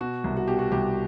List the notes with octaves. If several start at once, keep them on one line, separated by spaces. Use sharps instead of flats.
B2 F#4
C2
F#4
B2 G4
F#4
C2 G4